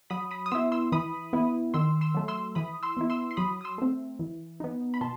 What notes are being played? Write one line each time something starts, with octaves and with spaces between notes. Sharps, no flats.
F#3 B5 D#6
B5 D#6
D#6
B3 E4 C6 E6
C6 E6
E3 B5 D#6
B3 E4
D#3 C6 E6
C6 E6
F#3 A3
C6 E6
E3 B5 D#6
C6 E6
B3 E4
C6 E6
C6
F#3 B5 D#6
D#6
C6 E6
A3 C4
E3
B3 D#4
B5
B2 A5 C6